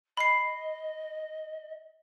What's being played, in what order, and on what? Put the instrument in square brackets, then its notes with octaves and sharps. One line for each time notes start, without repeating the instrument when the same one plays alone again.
[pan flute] D#5 [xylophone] B5 C7